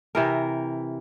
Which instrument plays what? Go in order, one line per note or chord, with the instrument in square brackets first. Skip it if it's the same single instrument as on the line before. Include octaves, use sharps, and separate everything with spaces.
[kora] C3 E3 A#4